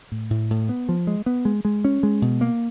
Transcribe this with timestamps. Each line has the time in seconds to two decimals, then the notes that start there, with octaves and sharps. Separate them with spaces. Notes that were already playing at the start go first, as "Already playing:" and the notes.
0.12 A2
0.30 A2
0.50 A2
0.69 B3
0.89 F3
1.07 G#3
1.26 B3
1.45 G#3
1.65 G#3
1.85 C#4
2.03 G#3
2.22 B2
2.41 A#3